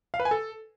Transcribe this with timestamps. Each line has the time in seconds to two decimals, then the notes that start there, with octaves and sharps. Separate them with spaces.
0.14 F5
0.20 B4
0.25 G#5
0.31 A4